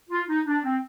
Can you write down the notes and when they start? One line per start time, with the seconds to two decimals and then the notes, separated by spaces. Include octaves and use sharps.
0.10 F4
0.29 D#4
0.46 D4
0.64 C4